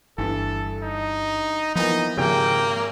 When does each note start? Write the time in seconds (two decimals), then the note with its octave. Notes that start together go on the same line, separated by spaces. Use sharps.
0.18 G1 G2 E3 A4
0.83 D#4
1.75 E3 F3 A#3 B3 D#4
2.17 G#1 C#3 F3 A#3 G4 G#4 G5